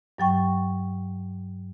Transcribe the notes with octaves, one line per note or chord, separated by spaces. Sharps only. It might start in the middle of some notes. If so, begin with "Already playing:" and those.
G2 F#3 G5 C#6